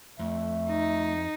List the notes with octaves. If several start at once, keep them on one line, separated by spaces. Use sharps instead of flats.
F2 A3 E5
D#4